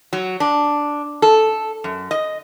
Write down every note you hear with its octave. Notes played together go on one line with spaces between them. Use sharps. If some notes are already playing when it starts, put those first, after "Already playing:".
F#3
D4
A4
F#2
D#5